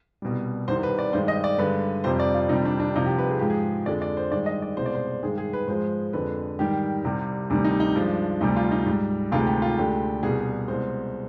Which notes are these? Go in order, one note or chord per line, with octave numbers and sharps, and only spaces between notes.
C2 B2 G3
C2 C3 D#3 C5
B4
D5
G2 D#3 G#3 C5
D#5
D5
G2 D3 G#3 B4
F2 C3 G3 C5
D5
F4
F2 C3 D#3 G3 D#4
D4
D4
C2 C3 F3 D#4
G4
B4
G#4
G#2 F3 G#3 G4
G#4
F2 D3 G#3 D5
D5
C5
G2 D#3 G#3 D5
D#5
D5
C2 B2 G#3 C5
D5
C5
G2 D#3 G#3 G#4
G#4
B4
G#2 F3 G#3 C5
F2 D3 G#3 B4
G#2 D#3 G3 G4
C2 C3 G3
D2 C3 D#3 G3 D4
D#4
D#4
G2 F3 G#3 D4
D2 C3 G3 D#4
F4
D#4
G#2 G3
D2 C3 D#3 G#3 F4
G4
F4
D2 D3 G#3 G4
C2 B2 G3 G#4
C2 B2 G#3 C5